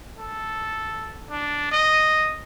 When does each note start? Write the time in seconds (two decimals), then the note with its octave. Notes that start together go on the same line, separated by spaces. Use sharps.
0.19 A4
1.30 D4
1.72 D#5